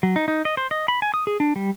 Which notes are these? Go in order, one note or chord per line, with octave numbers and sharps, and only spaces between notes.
F#3
D#4
D#4
D#5
C5
D#5
B5
G#5
D#6
G#4
D4
G3